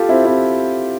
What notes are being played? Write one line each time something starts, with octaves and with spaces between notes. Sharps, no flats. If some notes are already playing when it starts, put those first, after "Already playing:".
Already playing: F4 G4 A4
C4 E4
C4 E4